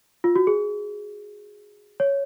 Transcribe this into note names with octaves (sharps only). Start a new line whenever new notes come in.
F4
F#4
G#4
C#5